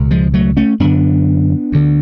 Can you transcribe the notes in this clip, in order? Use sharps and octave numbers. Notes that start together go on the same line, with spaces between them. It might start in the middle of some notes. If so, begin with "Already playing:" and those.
Already playing: C#2 B2
F3 G#3
F#3 A3
A3 C#4
F#2 D3 B3 D4
D2 D3